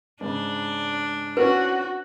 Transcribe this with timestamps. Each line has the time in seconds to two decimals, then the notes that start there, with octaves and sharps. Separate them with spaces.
0.21 G#2 C#3 D4
1.37 C4 C#4 F#4 B4